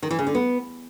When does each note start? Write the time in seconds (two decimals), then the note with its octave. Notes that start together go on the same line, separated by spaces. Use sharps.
0.02 D#3
0.11 E3
0.19 C#3
0.27 D3
0.35 B3